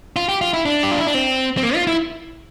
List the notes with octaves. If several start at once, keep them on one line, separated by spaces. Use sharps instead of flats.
F4
G4
F4
E4
D4
G4
F4
E4
D4
C4
C4
A#3
F4
E4